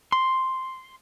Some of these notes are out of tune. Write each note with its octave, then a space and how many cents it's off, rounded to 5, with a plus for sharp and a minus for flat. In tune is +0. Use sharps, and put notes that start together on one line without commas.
C6 +0